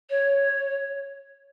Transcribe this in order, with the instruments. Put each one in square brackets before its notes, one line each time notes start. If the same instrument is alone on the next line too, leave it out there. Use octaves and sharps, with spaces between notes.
[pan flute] C#5